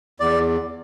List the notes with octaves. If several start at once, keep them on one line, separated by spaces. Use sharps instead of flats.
E2 D5